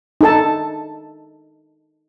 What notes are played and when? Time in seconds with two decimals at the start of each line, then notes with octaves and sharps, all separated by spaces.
0.21 D#4 A4 A5